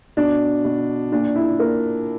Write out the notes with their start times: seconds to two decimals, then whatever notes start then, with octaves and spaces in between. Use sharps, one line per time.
0.17 B2 D4
0.65 B2
1.12 A#2 D4
1.35 E4
1.59 A#2 A#4